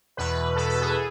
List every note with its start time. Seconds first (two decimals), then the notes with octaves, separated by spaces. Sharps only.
0.17 E2 B2 B4
0.56 E2 B2 A4
0.70 A4
0.81 G#4